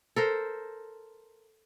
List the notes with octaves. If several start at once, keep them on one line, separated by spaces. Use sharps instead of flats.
A4 A#4 C5